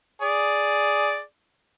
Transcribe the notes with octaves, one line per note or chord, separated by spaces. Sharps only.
G#4 D5